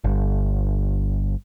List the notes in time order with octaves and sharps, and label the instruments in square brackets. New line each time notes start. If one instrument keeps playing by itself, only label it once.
[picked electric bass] G1